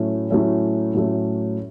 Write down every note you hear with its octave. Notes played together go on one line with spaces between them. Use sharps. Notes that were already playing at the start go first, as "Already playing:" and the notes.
Already playing: A2 F#3 A3 C#4
A2 F#3 A3 C#4
A2 F#3 A3 C#4